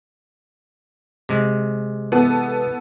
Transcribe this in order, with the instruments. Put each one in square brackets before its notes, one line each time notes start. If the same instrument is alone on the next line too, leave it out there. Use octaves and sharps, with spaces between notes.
[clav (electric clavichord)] C3 G#3
[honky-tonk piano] E3 B3 A4